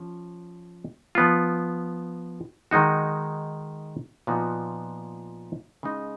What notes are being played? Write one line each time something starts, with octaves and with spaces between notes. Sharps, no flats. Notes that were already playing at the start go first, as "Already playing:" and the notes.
Already playing: F3 C#4
F3 B3 F4
D#3 G#3 D#4 F#4
A#2 F3 B3 D#4 F#4
C#3 G#3 D#4